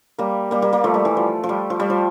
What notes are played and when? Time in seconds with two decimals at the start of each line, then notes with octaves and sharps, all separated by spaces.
0.18 G3 A#3
0.51 G3 A#3
0.62 G3 A#3
0.72 G3 A#3
0.84 F3 A3
0.94 G3
1.05 E3
1.17 F3
1.43 F3
1.49 G3
1.70 F3
1.80 G3
1.90 F3